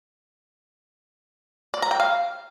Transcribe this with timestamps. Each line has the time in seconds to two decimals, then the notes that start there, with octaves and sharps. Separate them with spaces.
1.74 D5
1.82 A#5
1.91 G5
2.00 F5